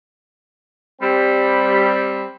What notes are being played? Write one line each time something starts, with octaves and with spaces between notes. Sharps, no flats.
G3 C4 B5